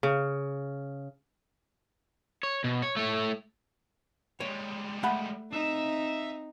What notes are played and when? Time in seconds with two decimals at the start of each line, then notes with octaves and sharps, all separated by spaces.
0.03 C#3
2.43 C#5
2.64 B2
2.82 C#5
2.97 A3 C#5
4.40 G3 G#3 C#5
5.03 A3 F#5 B5
5.53 C4 D#4 E5